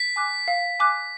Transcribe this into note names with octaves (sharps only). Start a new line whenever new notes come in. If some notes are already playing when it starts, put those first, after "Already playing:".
Already playing: B6
G#5 D6 F#6
F5
G#5 D6 F#6